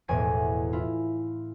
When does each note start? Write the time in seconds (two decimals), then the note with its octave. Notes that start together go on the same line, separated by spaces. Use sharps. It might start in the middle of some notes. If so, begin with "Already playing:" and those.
0.08 E1 E2 A2 G#5 G#6 D7
0.73 E4 F4